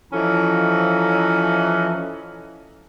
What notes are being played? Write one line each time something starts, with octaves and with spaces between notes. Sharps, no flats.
E3 F3 C#4 A4 D#5 A#5